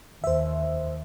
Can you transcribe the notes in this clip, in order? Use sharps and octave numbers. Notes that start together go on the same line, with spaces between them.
D#2 C5 E5